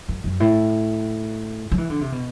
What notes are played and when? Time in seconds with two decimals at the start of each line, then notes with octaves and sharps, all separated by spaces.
0.09 F#2
0.24 F#2
0.40 A2
1.72 F#3
1.78 E3
1.90 D3
2.01 C3
2.12 B2